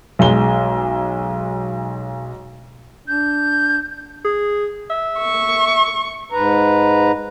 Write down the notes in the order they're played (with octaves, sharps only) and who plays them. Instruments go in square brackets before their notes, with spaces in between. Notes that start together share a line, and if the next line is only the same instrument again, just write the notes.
[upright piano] B1 G#3 G7
[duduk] D4 [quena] G6
[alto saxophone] G#4
E5
[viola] C#6
[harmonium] G#2 B4 A#5